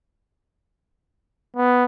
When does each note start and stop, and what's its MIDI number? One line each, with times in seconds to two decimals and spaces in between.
1.56 1.85 59